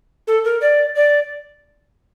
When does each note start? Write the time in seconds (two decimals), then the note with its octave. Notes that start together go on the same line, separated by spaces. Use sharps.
0.27 A4
0.44 A#4
0.61 D5
0.95 D5